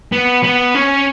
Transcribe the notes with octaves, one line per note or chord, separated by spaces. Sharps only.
B3
B3
C#4